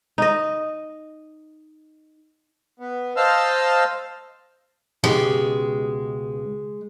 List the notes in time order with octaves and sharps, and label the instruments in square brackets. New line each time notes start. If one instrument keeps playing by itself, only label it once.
[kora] D#4 D#5
[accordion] B3
C5 D#5 F5 A5 E6 F6
[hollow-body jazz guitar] C#2 B2 G4 [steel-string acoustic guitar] G#3